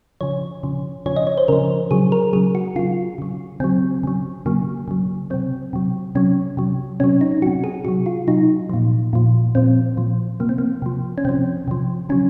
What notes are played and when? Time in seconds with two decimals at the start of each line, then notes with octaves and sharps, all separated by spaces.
0.21 C#3 F3 C#5
0.63 C#3 F3
1.06 C#3 F3 C#5
1.16 D#5
1.27 C#5
1.38 C5
1.48 C#3 F3 A#4
1.91 C#3 F#3 G#4
2.12 A#4
2.33 C#3 F#3 G#4
2.55 F#4
2.76 C#3 F#3 F4
3.18 C#3 F#3
3.60 C#3 F#3 C4
4.03 C#3 F#3
4.46 C#3 F#3 A#3
4.88 C#3 F#3
5.30 C3 F#3 C4
5.73 C3 F#3
6.15 C3 F#3 C#4
6.57 C3 F#3
7.00 C3 F#3 C#4
7.21 D#4
7.42 C3 F#3 F#4
7.64 G#4
7.85 C3 F#3 F#4
8.06 F4
8.28 C3 F#3 D#4
8.69 A#2 F3
9.13 A#2 F3
9.55 A#2 F3 C4
9.97 A#2 F3
10.40 C3 F3 A#3
10.49 C4
10.58 A#3
10.82 C3 F3
11.18 C#4
11.25 C3 F3 C4
11.68 C3 F3
12.09 C#3 F#3 C#4